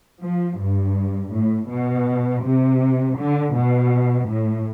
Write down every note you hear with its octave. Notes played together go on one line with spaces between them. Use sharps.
F3
G2
A2
B2
C3
D3
B2
A2